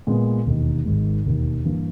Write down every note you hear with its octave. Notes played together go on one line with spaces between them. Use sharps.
A#2 G#3 B3
E1 D#2 D#3
G#1 G#2 D#3 G#3
E1 D#2 D#3
G2 E3 A#3